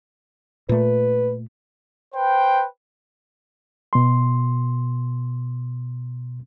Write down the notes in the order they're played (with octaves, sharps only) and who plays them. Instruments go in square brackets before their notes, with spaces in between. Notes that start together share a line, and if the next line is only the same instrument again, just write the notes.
[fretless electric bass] A#2 A3 [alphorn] B4
[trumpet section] B4 C5 G5
[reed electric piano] B2 C6